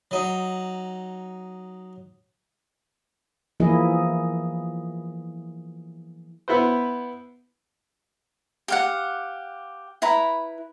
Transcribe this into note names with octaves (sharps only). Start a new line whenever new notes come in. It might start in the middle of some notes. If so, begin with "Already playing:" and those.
F#3 D#4
E3 F3 A#3 E4 G#4 D#5
B3 E4 B4 C5
G4 F5 F#5
E4 B4 A#5 B5